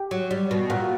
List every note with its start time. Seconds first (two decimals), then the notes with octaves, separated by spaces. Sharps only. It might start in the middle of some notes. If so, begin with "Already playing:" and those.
Already playing: G4 G5
0.11 F#3
0.31 G3
0.51 B2
0.70 A#2 F#4 F#5